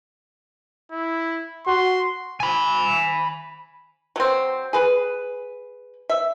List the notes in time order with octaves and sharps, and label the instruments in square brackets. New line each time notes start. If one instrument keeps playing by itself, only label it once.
[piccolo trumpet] E4
[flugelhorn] F#4 [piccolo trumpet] C6
[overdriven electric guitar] G#5 B5
[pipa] F#3 C4
G#4 B4
E5